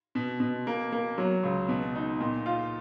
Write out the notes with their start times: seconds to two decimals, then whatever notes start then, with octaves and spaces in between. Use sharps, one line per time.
0.15 B2
0.40 B2
0.67 A#3
0.92 A#3
1.18 F#3
1.43 C#2
1.69 B2
1.95 D#4
2.20 A#2
2.46 F4